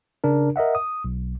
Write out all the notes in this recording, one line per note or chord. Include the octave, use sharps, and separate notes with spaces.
C#3 D4 A#4
A#4 D#5 E5 F#5
D#6
B1